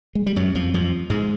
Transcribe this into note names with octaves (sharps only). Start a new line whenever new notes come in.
G#3
G3
F#2 F#3
F2 F3
F2 F3
G#2 G#3